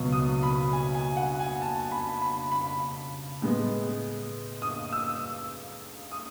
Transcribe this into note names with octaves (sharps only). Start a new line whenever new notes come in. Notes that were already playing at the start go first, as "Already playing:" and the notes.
Already playing: C#2 B2 F#3 B3
D#6
B5
G#5
G#5
F#5
G#5
A5
B5
B5
B5
A2 G#3 B3
D#6
E6
D#6